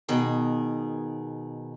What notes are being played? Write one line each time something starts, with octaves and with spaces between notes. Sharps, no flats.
B2 D#3 G#4